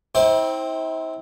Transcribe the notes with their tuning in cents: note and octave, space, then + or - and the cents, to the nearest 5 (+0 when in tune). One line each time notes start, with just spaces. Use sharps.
C4 +0 E4 -40 C5 +20